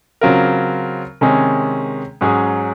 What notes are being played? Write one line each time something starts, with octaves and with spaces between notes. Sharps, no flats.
C#3 F#3 C4 F4 A#4
C3 D#3 G#3 C#4 G#4
G#2 F#3 C#4 G#4